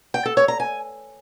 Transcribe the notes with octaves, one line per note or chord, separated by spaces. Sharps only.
G5
A4
C#5
A#5
G#5